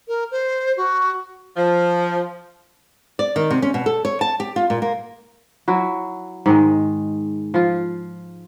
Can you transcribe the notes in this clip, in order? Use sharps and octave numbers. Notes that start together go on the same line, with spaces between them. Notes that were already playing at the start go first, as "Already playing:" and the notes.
A#4
C5
F#4
F3
D5
D#3
C3
C#4
B2
A4
C#5
A5
G4
F4
A#2
A#3
F#3 E4 F#4
G#2 D#3 G#3
F3 F4